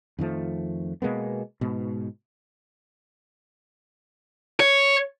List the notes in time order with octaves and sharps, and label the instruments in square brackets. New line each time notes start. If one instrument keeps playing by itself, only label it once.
[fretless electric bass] F2 D#3 F3 A3
B2 G#3 A#3 B3
G#2 B2
[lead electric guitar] C#5